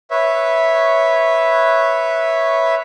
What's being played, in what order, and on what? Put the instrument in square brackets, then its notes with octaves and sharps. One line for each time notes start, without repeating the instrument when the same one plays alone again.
[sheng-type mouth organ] B4 C#5 E5